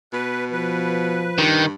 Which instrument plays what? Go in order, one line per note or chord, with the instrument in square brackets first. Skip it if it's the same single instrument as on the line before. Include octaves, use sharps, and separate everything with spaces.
[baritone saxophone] B2 [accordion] B4
[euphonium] F3 [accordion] B4
[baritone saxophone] G2 [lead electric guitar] D#3